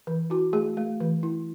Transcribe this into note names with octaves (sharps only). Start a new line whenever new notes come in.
E3
E4 F#4
A3 G#4
A3
E3
E4